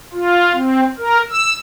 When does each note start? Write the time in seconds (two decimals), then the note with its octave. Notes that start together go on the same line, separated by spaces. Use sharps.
0.13 F4
0.53 C4
0.98 A#4
1.30 E6